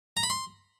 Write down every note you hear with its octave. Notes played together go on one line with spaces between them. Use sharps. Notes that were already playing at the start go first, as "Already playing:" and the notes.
A#5
B5
C6